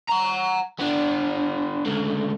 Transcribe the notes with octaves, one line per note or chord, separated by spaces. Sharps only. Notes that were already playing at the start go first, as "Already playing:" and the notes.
F#5 A#5
B3 D4
C#2 D3